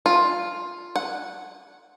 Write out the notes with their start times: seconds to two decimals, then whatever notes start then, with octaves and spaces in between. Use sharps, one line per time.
0.06 F4
0.96 F#5